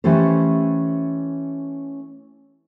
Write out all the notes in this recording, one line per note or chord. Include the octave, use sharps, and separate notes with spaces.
E3 A3 C#4 G4 A4 C5